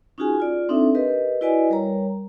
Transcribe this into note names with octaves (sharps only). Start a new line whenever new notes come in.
C#4 D#4 F4 F#4 G#4 G#5
F4 D5
C4 D4 D#4 A4 E5
G4 A#4 B4 D#5
E4 F#4 B4 D5 D#5 G#5
G3 A#4 C#5 A#5